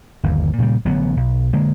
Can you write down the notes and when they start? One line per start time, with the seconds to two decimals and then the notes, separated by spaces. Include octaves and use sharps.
0.23 G1 D#2
0.58 A#2 C#3 F3 G3
0.85 A1 D3 F#3 B3
1.17 B1
1.53 D3 G#3 A#3